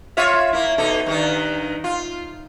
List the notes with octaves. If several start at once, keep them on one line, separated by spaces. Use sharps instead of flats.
F4 C#5 E5
A#3 E4
B2 D#4 A4
G2 D#3 D#4
F4